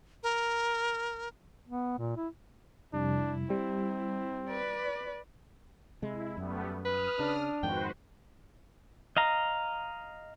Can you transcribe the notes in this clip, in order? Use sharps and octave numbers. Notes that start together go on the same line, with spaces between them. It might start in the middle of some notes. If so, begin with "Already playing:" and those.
A#4
B3
A#2
E4
F2 C3 G3 D4 E4
G3 C4
B4 D5
C3 G#3 E4
F#2 G3 A3 B3
B4 D#6 F6
C#3 D4
F2 G#2 D#3 F#4 B4 C5 G5
D#5 F5 A#5